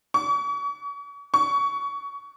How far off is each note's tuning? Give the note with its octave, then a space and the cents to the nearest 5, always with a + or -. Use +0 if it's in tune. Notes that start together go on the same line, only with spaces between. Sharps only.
C#6 +40
C#6 +25